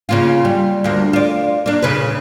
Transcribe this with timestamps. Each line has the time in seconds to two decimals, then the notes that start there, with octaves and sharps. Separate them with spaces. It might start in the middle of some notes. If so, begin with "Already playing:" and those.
0.09 C#3 A#3 F4
0.45 G3
0.84 D2 A#3
1.13 F4 D5
1.66 A#3 D4
1.82 A#2 C#3 B4